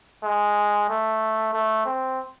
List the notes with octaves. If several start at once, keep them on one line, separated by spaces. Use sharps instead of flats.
G#3
A3
A3
C4